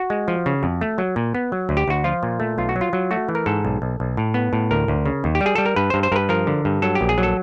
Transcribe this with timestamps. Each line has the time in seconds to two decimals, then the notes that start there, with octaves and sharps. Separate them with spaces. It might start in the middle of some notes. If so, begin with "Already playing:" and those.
Already playing: F#4
0.10 G#3
0.28 F3
0.46 C#3
0.63 F2
0.81 A3
0.98 F#3
1.16 A#2
1.35 B3
1.52 F#3
1.69 D2
1.77 G4
1.88 D2 F#4
2.04 F3 F4
2.23 A#2
2.40 A3
2.58 B1 F4
2.69 F#4
2.76 F#3
2.81 F4
2.93 F#3
3.11 A3 F#4
3.29 E3
3.35 A#4
3.46 G#2 A4
3.65 B1
3.82 B1
4.00 B1
4.17 A2
4.34 B3
4.53 A2
4.71 D2 A#4
4.88 D2
5.06 C#3
5.24 D#2
5.35 G4
5.41 G3
5.46 G#4
5.55 G3 A4
5.66 A#4
5.76 G2 B4
5.90 G2 C5
6.03 C5
6.12 G2 A#4
6.16 B4
6.29 F3 A#4
6.47 D3
6.65 G2
6.82 F#3 A4
6.95 G4
7.01 A#1
7.09 G#4
7.18 F#3
7.23 A4